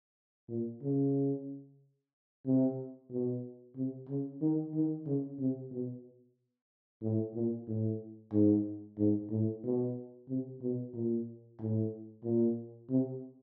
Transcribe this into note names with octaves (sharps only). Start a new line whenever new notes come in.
A#2
C#3
C3
B2
C3
C#3
D#3
D#3
C#3
C3
B2
A2
A#2
A2
G#2
G#2
A2
B2
C3
B2
A#2
A2
A#2
C3